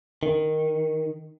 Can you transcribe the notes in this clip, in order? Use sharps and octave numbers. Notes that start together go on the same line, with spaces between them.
D#3